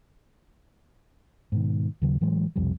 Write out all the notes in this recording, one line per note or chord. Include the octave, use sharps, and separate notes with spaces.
G#2 B2 D#3
D#2 C#3 F#3
A2 E3 F#3 G#3
B1 F2 C3 G3